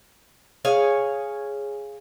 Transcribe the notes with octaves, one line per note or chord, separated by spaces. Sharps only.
G#4 C#5 F5 G#5